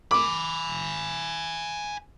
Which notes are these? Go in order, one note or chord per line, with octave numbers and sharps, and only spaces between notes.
G#5 B5 D6